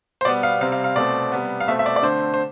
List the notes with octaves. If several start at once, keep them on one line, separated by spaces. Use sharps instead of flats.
C5
B2 G3 B3 D5
F5
C3 G3 C4 F5
F5
F5
B2 A3 C4 D5
C3 G3 B3
F5
B2 A3 C4 E5
E5
D5
D5
D3 A3 C4 C5
C5